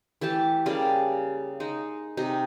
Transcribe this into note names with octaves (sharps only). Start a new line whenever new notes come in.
E3 A3 G4 A5
C#3 G3 A#3 D5
G#3 D#4
C3 D#4